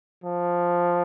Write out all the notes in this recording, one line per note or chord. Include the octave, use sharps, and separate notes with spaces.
F3